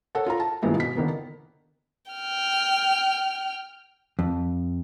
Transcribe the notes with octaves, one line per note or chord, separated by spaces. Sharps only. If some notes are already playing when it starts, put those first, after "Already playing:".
A4 A#4 C#5 F#5 A5
F4 A4 A#5
A5
G2 A#2 D#3 G#3 B3 E4
B2 B6
D3 D#3 A#3 B3
G5 F6
F2